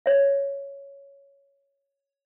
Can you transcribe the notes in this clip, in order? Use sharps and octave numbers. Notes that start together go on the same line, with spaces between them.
C#5 E5